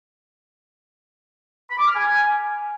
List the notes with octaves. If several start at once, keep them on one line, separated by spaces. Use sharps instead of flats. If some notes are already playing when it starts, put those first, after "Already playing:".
B5
D6
F6
G#5